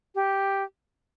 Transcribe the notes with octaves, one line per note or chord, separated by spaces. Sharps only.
G4